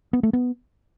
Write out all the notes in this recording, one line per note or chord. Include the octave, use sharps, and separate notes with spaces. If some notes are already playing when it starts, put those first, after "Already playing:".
B3
A3
B3